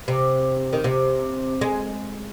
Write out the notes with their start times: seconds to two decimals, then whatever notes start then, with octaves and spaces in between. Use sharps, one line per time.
0.08 C3
0.73 D#3
0.84 C3
1.61 G#3